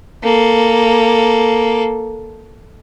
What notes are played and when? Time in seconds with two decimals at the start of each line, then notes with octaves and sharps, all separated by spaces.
0.23 A#3 A4